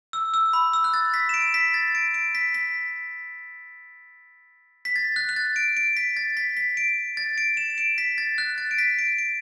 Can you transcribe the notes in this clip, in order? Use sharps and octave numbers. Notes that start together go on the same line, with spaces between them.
E6
E6
B5
E6
F#6
A6
B6
E7
D7
B6
A6
D7
D7
B6
B6
B6
A6
F#6
F#6
A6
D7
D7
B6
A6
B6
B6
D7
A6
D7
E7
D7
B6
A6
F#6
A6
D7
B6
D7
D7